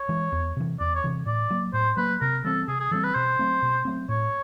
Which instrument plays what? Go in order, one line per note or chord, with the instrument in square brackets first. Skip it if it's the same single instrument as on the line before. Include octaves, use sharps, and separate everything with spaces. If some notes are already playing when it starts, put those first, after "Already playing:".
Already playing: [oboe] C#5
[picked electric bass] E3 G#3
E2
C3 E3
[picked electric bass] E2 [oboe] D5
[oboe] C#5
[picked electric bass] C3 E3
[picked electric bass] A2 [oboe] D5
[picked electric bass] F#3 A#3
[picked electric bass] A2 [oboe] C5
[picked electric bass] F#3 A#3 [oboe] B4
[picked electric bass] C3 [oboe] A#4
[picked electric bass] E3 G3 C4 [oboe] A4
[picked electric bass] C3 [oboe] G#4
[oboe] G#4
[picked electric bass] E3 G3 C4 [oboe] A4
[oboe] B4
[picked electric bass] B2 [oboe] C5
[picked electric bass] F#3 A3 C4
B2
F#3 A3 C4
[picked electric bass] A2 [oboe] C#5